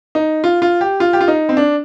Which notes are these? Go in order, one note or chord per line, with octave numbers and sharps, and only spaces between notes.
D#4
F4
F4
G4
F4
G4
F4
D#4
C4
D4